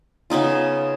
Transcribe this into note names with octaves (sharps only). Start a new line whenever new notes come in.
C#3 B3 D#4 F4